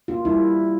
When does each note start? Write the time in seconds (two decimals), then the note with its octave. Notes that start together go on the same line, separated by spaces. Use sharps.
0.08 A#3 F4
0.25 G3 E4